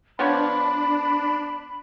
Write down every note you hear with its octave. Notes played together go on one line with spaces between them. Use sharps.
F3 B3 D4 C#5 B5